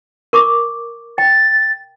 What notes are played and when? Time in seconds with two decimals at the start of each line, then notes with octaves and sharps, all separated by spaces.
0.33 A#4 C#6 D6
1.18 G5 A6